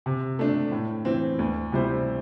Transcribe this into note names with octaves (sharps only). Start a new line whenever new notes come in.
C3
A3 D4
A2
E3 C4
D2
C3 G3 E4 C5